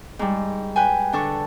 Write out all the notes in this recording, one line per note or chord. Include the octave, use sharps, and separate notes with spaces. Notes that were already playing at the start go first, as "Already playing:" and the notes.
G#2 G3
B4 G5 G#5
D3 D4 A4 C#6